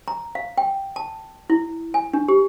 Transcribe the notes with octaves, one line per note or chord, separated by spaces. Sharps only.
A#5
F5
G5
A5
E4
G#5
D4
G4